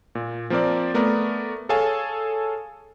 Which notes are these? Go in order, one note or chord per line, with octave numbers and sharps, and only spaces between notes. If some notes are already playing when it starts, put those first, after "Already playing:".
A#2
F3 A#3 C4 A#4 D5
A3 B3 A#4 D5
G#4 A4 C#5 F5 G#5 A5